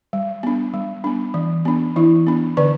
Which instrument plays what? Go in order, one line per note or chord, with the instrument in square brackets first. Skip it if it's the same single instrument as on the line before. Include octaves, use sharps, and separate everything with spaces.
[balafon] G3
B3 D4
G3
B3 D4
E3
B3 D4
E3 E4
B3 D4
D3 B4 D5